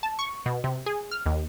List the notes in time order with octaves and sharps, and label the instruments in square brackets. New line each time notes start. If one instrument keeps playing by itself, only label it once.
[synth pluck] A5
C#6
B2
C3
G#4
F6
D#2